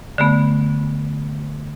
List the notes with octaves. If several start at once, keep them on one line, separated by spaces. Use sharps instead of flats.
D3 A3 B3